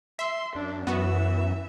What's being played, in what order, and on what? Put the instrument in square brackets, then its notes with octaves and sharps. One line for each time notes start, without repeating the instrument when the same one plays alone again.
[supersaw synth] E5 [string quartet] C6
[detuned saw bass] F#2 [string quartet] D4
[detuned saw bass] F#2 [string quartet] E3 E5 [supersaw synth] B3 F#4